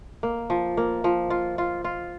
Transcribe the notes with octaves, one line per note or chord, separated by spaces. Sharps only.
A#3
F3
A#3
F3
F4
F4
F4